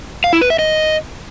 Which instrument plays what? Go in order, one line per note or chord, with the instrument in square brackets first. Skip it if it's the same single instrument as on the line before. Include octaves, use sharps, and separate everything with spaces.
[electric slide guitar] F5
E4
B4
E5
D#5